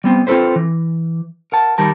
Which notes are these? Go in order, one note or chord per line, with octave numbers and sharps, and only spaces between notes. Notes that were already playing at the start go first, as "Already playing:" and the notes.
G3 B3 C4
C4 F4 G4 A4 B4 C5
E3
A#4 F#5 A5
D#3 G3 A#4 A5